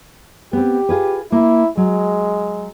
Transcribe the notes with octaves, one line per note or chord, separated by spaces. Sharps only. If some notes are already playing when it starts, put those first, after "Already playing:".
B3 C4 G4
F4 G#4 B4
A#3 E4
F#3 G#3